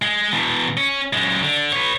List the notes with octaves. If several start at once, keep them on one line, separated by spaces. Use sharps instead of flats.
G#3
E2 B2
C#4
F#2 G#3
D3
B4 C#5